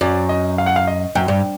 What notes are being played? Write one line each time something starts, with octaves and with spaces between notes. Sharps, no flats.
F#2 D5
D#5
F5
F#5
F5
D#5
F#2 G5
G2